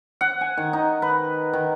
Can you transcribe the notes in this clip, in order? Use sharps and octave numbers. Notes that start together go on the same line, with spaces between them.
F#5
G#5
D#3
D#4
B4
D#3